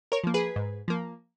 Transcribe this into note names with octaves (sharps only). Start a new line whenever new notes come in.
A#4 C#5
F3 A#3
G#4 B4
G#2
F3 A#3